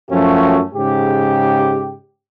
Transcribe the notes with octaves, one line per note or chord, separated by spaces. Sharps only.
F#2 F3 A3 C#4 F#4
G#2 C#3 G4